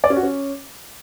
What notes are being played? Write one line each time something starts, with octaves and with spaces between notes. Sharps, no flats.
D5
C#4
F#4
C#4